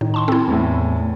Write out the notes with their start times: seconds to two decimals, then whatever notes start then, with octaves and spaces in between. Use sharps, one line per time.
0.01 A2 D#3
0.14 A5 C6 C#6
0.28 C4 E4 A4
0.47 E2 A2